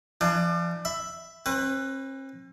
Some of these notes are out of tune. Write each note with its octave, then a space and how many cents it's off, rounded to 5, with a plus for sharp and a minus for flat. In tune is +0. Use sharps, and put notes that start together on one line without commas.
F3 -35 D4 +30
E5 +0 B5 +15
C4 +45 B4 +5